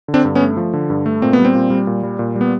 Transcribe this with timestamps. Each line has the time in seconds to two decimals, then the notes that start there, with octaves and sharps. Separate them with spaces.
0.08 D3
0.14 C4 D4
0.25 G2
0.35 B3 C#4
0.41 A3
0.57 F3
0.73 D3
0.90 G2
1.06 A3
1.22 A#2 C4
1.33 B3
1.39 G3
1.45 C4
1.55 A#2
1.70 G3
1.87 A#2
2.03 G3
2.19 A#2
2.36 G3
2.41 B3